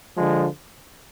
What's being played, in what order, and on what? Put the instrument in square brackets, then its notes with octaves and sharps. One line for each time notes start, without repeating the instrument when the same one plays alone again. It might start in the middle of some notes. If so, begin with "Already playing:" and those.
[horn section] D3 F3 G#3